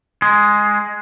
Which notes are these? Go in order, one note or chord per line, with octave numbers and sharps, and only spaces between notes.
G#3